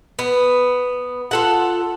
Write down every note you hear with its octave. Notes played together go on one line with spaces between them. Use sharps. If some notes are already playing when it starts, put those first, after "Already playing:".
B3
F4 A4 F#5